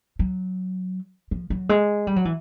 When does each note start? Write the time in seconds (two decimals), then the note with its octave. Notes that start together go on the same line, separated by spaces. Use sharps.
0.19 F#3
1.31 F3
1.50 F#3
1.69 G#3
2.07 G3
2.16 F#3
2.25 E3